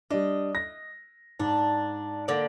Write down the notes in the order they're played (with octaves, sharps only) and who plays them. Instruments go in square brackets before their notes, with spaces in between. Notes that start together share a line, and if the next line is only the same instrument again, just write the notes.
[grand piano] G3 D4 [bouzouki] D#5
[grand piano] A#6
[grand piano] G#2 [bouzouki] D4
[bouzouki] D3 A#3 D5